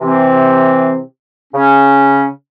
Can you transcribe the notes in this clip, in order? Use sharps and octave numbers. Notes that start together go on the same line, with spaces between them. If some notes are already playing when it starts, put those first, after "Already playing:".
C3 E3 C4
C#3 C#4